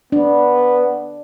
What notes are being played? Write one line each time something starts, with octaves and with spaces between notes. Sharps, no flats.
B3 D4